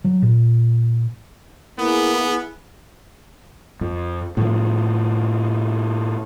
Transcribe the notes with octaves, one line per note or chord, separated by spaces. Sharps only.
F#3
A#2
A#3 B3 E4 G#4
F2
A2 F3